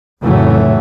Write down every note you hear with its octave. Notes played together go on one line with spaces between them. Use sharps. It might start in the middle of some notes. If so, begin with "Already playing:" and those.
F1 A2 C#3 E3 F#3 A3